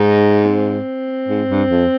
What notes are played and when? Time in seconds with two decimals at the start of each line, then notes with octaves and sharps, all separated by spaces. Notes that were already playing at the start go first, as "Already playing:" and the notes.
Already playing: G#2 D#4
0.45 C4
1.28 G#2
1.49 G2
1.70 F2